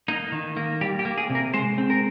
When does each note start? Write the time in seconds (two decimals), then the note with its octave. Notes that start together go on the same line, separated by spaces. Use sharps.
0.08 A#3 D#4
0.32 D#3
0.57 A#3
0.81 G3 G4
0.99 G4
1.05 A#3
1.18 G#4
1.30 C3
1.35 A#4
1.54 G#3 C5
1.78 C4
1.90 A#4